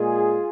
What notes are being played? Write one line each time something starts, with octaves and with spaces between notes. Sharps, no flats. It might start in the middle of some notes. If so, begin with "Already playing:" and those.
Already playing: A#2 G#3 F4 G#4